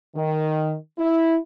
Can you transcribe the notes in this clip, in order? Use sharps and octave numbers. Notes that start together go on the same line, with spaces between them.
D#3
E4